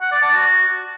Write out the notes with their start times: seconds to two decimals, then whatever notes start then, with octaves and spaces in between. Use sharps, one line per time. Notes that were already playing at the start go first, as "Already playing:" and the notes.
0.01 F#5
0.12 D5
0.22 A5
0.33 F#4